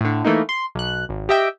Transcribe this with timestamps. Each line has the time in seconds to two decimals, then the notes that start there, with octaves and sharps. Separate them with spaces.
0.01 A2 D3
0.25 E3 A3 A#3 D#4
0.49 C6
0.75 B1 F#6
1.09 G#1
1.29 G4 D#5 E5 G5